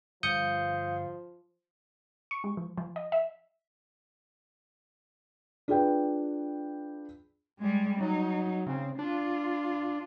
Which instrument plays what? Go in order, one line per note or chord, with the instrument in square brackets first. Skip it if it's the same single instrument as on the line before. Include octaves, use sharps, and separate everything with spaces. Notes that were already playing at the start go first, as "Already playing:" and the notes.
[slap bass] G1 [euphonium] F3 [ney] F5 [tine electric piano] D#6 G6 C#7
[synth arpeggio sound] C#6
G#3
F3
F3
D#5
E5
[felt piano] D4 F4 G#4 B4 G5
[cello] G3 G#3
[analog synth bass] F#3 [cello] D#4
[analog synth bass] C#3 [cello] C4
[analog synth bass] D4 [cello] F4